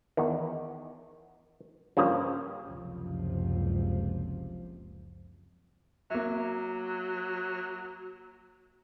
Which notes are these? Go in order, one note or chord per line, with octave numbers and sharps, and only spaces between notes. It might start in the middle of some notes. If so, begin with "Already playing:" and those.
E2 D#3
G2 C#3 F3 A#3
F#1 C#2 C3 F3
F#3 A#3 E5